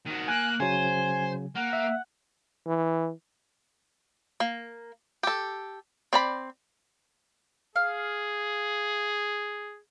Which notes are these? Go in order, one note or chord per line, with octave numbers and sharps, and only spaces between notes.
D#3 F#4
A#3 G#5 F#6
C#3 F#3 C5 G#5
A#3 F#5
E5
E3
A#3
G4 A4
C4 D5 B5
G#4 F5